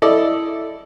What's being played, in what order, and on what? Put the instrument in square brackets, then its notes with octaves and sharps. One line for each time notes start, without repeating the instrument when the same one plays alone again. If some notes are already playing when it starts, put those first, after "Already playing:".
[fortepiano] E4 A4 D5 D#5